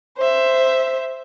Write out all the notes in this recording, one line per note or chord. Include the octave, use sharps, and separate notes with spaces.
C5 E5